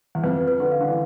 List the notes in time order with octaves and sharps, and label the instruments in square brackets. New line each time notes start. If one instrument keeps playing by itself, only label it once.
[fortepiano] E2
[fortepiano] F2 [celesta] B4
[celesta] B4
[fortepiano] D3
[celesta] F5
[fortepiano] D3
E3